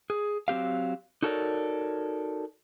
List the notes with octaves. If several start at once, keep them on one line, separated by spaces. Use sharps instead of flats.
G#4
F#3 C4 G4 F5
D#4 F#4 A4 A#4 C#5 D5